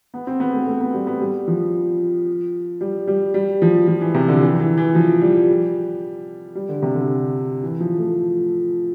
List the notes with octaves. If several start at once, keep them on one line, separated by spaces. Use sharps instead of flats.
B3
C4
B3
A3
A3
B3
G3
B3
G3
F3
G3
G3
G3
F3
F3
E3
C3
D3
E3
E3
E3
F3
G3
G3
D3
C3
D3
E3
F3
A3